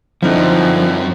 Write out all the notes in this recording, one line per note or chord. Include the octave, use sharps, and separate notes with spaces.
F#2 D3 F3 C4 D#4 E4